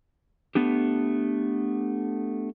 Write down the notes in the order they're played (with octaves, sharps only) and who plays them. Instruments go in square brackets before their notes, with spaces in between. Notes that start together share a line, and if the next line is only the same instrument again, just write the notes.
[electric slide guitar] A3 B3 D4 G4